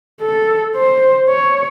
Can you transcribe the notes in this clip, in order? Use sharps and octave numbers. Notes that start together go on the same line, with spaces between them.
A4
C5
C#5